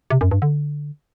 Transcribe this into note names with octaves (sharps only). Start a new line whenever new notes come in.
C3
F#2
G2
D3